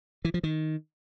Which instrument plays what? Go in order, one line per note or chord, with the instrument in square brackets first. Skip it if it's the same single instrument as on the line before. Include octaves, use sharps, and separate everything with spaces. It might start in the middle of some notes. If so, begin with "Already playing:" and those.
[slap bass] E3
F3
D#3